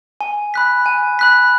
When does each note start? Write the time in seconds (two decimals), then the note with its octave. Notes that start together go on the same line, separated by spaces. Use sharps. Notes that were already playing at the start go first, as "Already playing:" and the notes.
0.21 G#5
0.54 B5 F#6 B6
0.86 G#5
1.19 B5 F#6 B6